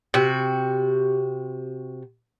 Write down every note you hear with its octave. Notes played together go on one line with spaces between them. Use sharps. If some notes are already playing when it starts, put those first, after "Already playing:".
C3 F#4